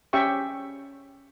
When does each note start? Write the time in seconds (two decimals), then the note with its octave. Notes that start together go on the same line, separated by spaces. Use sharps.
0.13 C#4 G4 E5 G5 C#6